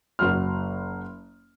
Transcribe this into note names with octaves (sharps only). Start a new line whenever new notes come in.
F#1 F#3 C6 F6